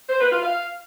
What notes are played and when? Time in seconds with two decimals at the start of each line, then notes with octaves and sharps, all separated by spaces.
0.09 C5
0.20 B4
0.31 F4
0.42 F5